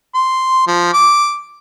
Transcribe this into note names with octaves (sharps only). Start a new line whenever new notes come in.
C6
F3
D6